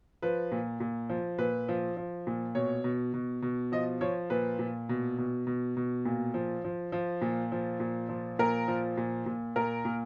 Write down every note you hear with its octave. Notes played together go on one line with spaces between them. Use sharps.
F3 B4
A#2
A#2
F3
A#2 B4
F3
F3
A#2
B2 C#5
B2
B2
B2
F3 D#5
F3 C#5
A#2 B4
A#2
B2
B2
B2
B2
A#2
F3
F3
F3
A#2
F3
A#2
F3
A#2 A#4
F3
A#2
A#2
A#2 A#4
A#2